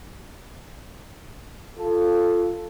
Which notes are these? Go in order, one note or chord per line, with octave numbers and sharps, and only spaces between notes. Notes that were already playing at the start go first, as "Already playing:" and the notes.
F4 A4